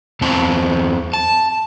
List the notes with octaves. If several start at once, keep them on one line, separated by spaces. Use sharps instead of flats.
E2 E3 C4 A5
A5